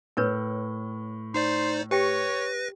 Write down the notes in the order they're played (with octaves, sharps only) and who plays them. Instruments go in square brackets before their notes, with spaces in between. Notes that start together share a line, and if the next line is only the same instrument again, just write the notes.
[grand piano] A2 [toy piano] A#4 B4 C#5
[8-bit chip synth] D#4 C5 D5 [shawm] C6
[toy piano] G4 G5 [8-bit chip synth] B4 A#6 [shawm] C#5